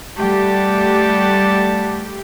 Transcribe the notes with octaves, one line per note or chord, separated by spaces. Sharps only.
G3 A3 G4 D5 F#5 A5